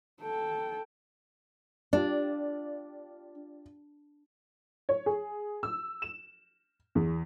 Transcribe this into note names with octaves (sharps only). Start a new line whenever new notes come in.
A4 G5
D4 F4 G4 D5
C#5
G#4
E6
E7
E2